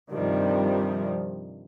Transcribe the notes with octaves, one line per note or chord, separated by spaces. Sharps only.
G2 C3 D#3 F3 G3